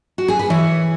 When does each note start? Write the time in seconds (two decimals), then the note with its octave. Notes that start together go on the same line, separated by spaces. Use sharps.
0.18 F#4
0.28 G#4
0.39 B4
0.50 E3 C#5